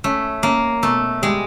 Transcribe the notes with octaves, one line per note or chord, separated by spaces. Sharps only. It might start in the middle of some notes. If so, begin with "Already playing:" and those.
A3 C#4
A#3 C#4
B2 A3
G3 G#3